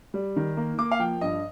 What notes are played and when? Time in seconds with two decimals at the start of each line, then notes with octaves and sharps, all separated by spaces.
0.14 G3
0.36 D#3
0.57 A#3
0.78 A#3 D6
0.92 F5
0.99 F3 G5
1.21 G2 D#5